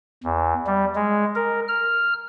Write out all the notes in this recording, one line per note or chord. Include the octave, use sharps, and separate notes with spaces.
E2
G3
G#3
A#4
F6